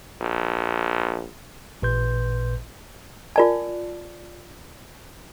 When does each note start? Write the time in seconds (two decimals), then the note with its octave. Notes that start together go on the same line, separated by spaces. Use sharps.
0.21 A#1
1.82 A1 A#2 B4 C6 G6
3.36 F4 A#4 D5 G#5 A5